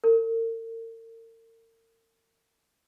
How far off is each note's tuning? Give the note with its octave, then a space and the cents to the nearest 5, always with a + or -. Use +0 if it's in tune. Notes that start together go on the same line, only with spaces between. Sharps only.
A#4 -45